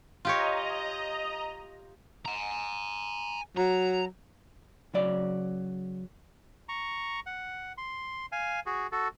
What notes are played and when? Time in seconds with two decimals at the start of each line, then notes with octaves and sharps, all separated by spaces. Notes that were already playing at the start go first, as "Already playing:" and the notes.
0.25 F4 G4 C#5 D#5 A#5
2.26 G#5 A#5
3.57 F#3 A#5
4.94 C#3 F#3 D5
6.69 A#5 C#6
7.26 F#5
7.78 C6
8.32 F5 G#5
8.66 F#4 G#4
8.92 F#4 A4